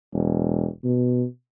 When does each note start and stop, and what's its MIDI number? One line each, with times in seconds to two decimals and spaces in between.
0.13 0.66 28
0.84 1.25 47